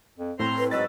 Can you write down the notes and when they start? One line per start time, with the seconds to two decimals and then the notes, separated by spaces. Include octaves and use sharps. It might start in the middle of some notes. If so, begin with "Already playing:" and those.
0.18 F2
0.39 A2 C4 C5 A#5 C6
0.58 B4
0.71 G#2 F#3 B4 D#5 E6 A6